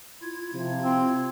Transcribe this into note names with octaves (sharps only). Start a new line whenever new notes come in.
E4 F4 G#6
C3 F3
C4